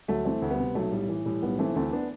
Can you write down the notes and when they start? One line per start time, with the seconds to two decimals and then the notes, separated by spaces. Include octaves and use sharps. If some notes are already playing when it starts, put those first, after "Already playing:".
0.08 D2 F#3 A3
0.25 E3 A3 C4
0.42 D2
0.50 G3 B3
0.59 C3
0.75 B1 F#3 A3
0.92 A2 G3
1.09 E3
1.26 A2 G3
1.42 B1 G3 B3
1.59 E3 A3 C4
1.76 D2 A3 C4
1.92 B3 D4